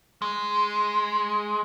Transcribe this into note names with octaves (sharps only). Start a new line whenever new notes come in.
G#3